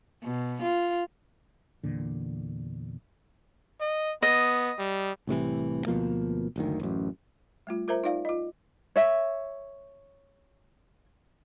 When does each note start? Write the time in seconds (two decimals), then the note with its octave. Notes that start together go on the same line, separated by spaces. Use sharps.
0.23 B2
0.62 F4
1.83 E2 A#2 D3
3.81 D#5
4.22 B3 D#5
4.79 G3
5.27 C2 A2 C3 E3
5.87 D2 B2 F3 A#3
6.56 F#1 D2 D#3
6.80 A1 F#2
7.67 G3 A3 F4
7.88 F4 A#4 C5 E5 A#5
8.04 D#4 F4 D5 F5
8.25 F4 D#5
8.96 C#5 E5